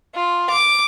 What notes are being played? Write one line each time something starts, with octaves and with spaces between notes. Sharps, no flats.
F4
D6